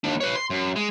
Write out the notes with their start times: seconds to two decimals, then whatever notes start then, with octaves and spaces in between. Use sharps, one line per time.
0.04 D#2 D4
0.21 B4 C#5
0.36 C6
0.50 F#2
0.76 G#3